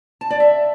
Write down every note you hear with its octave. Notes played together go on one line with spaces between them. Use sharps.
A5
D5
E5